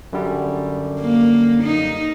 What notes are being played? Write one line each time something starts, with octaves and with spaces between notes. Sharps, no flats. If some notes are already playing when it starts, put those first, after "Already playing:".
F#2 D3 G3
A#3
D#4